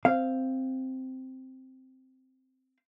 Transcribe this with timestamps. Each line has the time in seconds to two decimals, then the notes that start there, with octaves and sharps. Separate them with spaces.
0.05 C4 F5